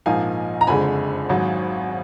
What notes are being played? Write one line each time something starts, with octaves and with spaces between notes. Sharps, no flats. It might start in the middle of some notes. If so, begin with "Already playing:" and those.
A#1 G#2 F3 A#3 D#4 F5 G#5
A#5
F#1 F2 D3 G#3 G#5 B5
G#1 G#2 F#3